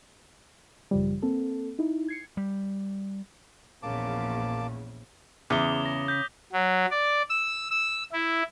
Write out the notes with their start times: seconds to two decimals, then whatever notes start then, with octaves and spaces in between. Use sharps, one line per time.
0.91 A1 F#2 C#3 F3 G3
1.22 A#3 C4 A4
1.79 D#4 E4
2.08 G#6 C7 C#7
2.37 G3
3.83 A#1 E2 A#2 C#3 A#3 A5 D6
5.50 E2 C#3 D6 D#6 G7
5.86 A#6
6.08 G6 A#6 B6
6.53 F#3
6.91 D5
7.30 E6
7.70 E6
8.12 E4